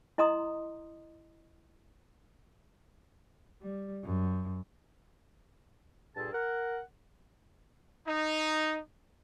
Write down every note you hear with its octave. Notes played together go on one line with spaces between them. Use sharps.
E4 D#5 A#5 C6 D#6
G3
F#2
G2 A#2 G#4 A4 A5
A#4 F#5
D#4